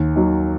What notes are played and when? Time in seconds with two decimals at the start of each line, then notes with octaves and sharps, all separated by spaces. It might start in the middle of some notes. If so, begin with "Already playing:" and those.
Already playing: D#2
0.16 D#3 F#3